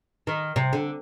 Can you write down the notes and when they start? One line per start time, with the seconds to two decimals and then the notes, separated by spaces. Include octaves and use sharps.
0.27 D#3
0.56 C3
0.73 D3